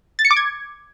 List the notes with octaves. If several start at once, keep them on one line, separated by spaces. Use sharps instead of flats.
A6
C#7
D6
G#6